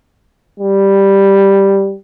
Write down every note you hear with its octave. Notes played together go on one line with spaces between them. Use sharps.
G3